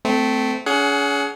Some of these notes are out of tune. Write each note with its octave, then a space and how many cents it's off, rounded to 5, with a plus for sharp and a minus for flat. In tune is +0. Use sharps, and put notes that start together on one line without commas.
A3 +0 C4 -25
C#4 +40 G#4 +20 F#5 +0